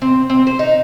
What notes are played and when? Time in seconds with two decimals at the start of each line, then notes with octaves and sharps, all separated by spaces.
0.02 C4
0.30 C4
0.47 C5
0.59 D#4